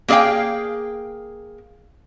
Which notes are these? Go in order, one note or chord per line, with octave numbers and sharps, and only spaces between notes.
A#3 G#4 D5 F5 G5